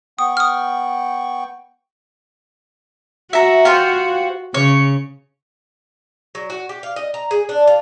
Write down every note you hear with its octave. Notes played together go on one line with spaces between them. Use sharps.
B3 G5 C#6 D#6
D#6 F6
F#4 E5 A#5
F4 G4 C5
C#3 C#5
F#3
F#4
G4
F5
D#5
A#5
G#4
D4
F4